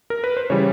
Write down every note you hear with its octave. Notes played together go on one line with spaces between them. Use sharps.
A#4
B4
C5
C#3 E3 G3 C#5